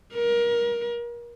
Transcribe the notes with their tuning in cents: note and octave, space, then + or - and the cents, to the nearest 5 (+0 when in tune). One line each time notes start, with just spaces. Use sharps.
A#4 +25